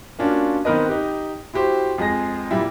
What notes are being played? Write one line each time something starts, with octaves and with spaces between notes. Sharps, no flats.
A#3 C#4 D4 F4 F#4
D#3 B3 C4 A#4 B4 D#5
D#4 G4
E4 F#4 G4 C5
F2 G#3 G#4 A#6
A#2 G3 E4